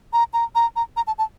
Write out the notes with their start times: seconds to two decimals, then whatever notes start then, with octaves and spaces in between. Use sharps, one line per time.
0.13 A#5
0.33 A#5
0.55 A#5
0.76 A#5
0.96 A#5
1.07 A5
1.18 A5